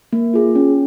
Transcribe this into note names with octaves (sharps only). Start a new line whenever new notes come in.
A#3
F4 G#4
C#4